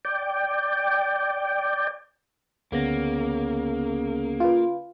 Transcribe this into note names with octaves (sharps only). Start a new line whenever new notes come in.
D5 G5
D2 C#3 A#3 B3 A#6
F4 B4